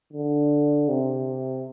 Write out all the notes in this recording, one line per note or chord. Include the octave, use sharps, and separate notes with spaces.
D3
C3